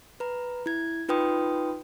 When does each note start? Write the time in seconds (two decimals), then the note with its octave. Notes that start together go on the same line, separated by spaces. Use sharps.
0.20 B4 A#5
0.66 E4 G#6
1.09 D#4 F4 B4 G5 C6 D#6